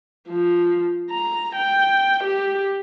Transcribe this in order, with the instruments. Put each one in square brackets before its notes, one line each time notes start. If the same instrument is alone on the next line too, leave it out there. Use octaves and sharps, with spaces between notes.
[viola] F3
A#5
G5
G4